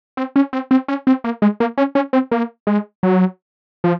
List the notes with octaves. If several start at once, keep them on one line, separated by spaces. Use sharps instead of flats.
C4
C#4
C4
C4
C#4
C4
A#3
G#3
A#3
C#4
C#4
C4
A#3
G#3
F#3
F3